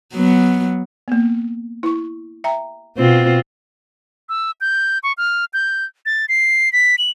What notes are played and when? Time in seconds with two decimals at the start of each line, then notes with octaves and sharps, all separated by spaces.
0.13 F#3 B3
1.08 A#3 B3
1.83 E4 C#6
2.44 E5 G5 A#5
2.97 B2 C4 F4
4.29 E6
4.61 G6
5.03 C#6
5.18 F6
5.54 G6
6.06 A6
6.29 C7
6.73 B6
6.98 F#7